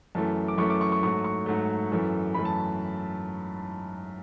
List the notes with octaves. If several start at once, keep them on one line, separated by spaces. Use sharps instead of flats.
F#2 E3 A3 A5
D6
F#2 E3 A3 C#6
D6
C#6
C#6
G#2 F#3 A3 C#6
C#6
G#2 F#3 A3
F#2 E3 A3
F#2 E3 A3 B5
A5